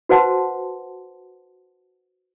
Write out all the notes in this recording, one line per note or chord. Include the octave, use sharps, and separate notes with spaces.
F#4 B4 C5 F#5 A5 C6